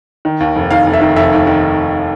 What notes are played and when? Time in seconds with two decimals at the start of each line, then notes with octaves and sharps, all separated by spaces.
0.25 D#3
0.40 D#2
0.56 F1
0.71 D#2 F5
0.87 F1
0.93 E5
1.01 D#3
1.16 F1 E5
1.32 D#2
1.47 D#3